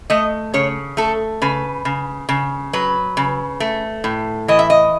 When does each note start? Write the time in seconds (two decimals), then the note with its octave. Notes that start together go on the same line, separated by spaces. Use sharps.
0.10 A3 D#5
0.54 C#3 C#5
0.97 A3 A4
1.42 C#3 B4
1.85 C#3
2.29 C#3
2.73 F#3 B4
3.17 C#3
3.60 A3
4.04 A2
4.48 E3 D#5
4.59 E5
4.70 D#5